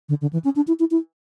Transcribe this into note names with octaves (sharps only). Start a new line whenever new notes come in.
D3
D3
E3
C#4
D4
E4
E4
E4